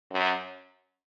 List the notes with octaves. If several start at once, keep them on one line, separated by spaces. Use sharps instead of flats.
F#2